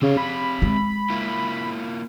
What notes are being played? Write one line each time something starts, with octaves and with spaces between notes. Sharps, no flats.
C#3 C4 G4 F5
B5
G#3
A#3 E4 F4